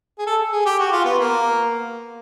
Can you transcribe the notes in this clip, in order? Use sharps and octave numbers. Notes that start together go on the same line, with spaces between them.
G#4
A4
G#4
G4
F#4
F4
B3
A#3